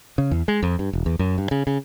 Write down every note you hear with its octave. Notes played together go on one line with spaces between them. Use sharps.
C#3
E2
G#3
F2
G2
E1
E2
F#2
G2
C#3
C#3